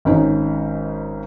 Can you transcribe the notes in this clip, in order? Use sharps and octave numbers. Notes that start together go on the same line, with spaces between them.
G#1 C#4 D#4